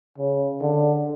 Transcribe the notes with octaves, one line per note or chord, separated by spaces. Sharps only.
C#3
D3